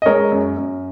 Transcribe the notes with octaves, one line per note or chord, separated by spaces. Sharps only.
D#5
G#3 A#4 C#5
F#2
F#2